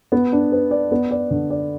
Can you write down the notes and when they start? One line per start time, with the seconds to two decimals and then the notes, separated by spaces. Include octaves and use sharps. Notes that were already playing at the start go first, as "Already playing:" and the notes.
0.12 B3
0.32 D4
0.52 B4
0.71 D5
0.91 B3
1.11 D5
1.31 D3
1.50 D5